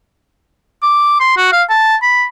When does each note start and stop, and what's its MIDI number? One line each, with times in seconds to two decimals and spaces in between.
0.83 1.19 86
1.20 1.34 84
1.37 1.52 66
1.52 1.63 77
1.70 1.96 81
2.03 2.24 83